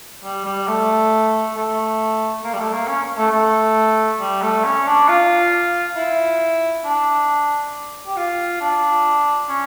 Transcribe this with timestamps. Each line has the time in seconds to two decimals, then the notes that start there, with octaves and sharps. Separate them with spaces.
0.24 G3
0.45 G3
0.67 A3
1.56 A3
2.44 A#3
2.53 G3
2.59 A3
2.73 A#3
2.88 C#4
3.17 A3
3.31 A3
4.20 G3
4.42 A3
4.65 C#4
4.87 D4
5.09 F4
5.96 E4
6.85 D4
8.07 G4
8.16 F4
8.61 D4
9.49 C#4